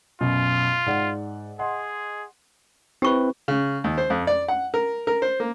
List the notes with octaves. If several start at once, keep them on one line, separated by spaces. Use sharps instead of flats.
F#2 B2 F4
G#2 D5 F#5
G#4 D#5 F#5 C6
C4 E4 G4 B4 C#6
C#3
D#2
C5
F2
D5
F#5
A#4
A#4
C5
A#3